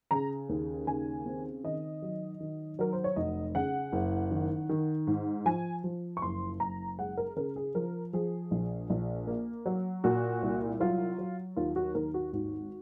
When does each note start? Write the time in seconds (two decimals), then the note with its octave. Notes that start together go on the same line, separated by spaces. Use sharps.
0.11 C#3 A#5
0.49 D#2
0.87 C#3 G#5
1.26 C4
1.64 D#3 D#5
2.02 F#3
2.40 D#3
2.79 F#3 A#4
2.93 C5
3.04 C#5
3.16 F1 D#5
3.55 C#3 F#5
3.92 F#1
4.31 D#3
4.69 D#3
5.07 G#2
5.46 F3 G#5
5.84 F3
6.17 C#6
6.22 F#1 C6
6.60 F#1 A#5
6.99 G#3 F#5
7.17 A#4
7.36 C#3 A#4
7.56 G#4
7.75 F3 A#4
8.13 F3 G#4
8.51 A#1
8.90 A#1
9.27 A#3
9.66 F#3
10.04 A#2 F#4
10.42 C2
10.80 F#3 F4
11.19 F#3
11.56 D#2 F4
11.76 F#4
11.95 D#2 A#4
12.14 F#4
12.33 G#1 F#4